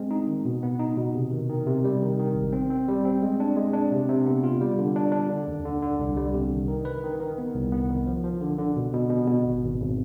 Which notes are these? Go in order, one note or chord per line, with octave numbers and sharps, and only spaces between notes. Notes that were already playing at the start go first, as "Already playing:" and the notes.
Already playing: G#3 C4
D#4
D#3
B2
B3
D#4
B2
C3
D#3
D#3
C3
G3
D#3
D#3
G#1
C4
C4
G3
C4
G#3
D4
G#3
D4
C3
C3
B3
F4
G3
D3
D4
D4
D3
D#2
D3
D3
C2
G3
C3
D#3
D#3
B4
D#3
D#3
B3
C2
B3
D#3
F3
F3
D3
D3
B2
B2
B2
B2
G#1
G#1
G#1